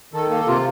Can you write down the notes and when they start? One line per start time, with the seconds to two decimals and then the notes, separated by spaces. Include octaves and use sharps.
0.13 D#3 A4
0.30 A#3 A4
0.47 C3 F4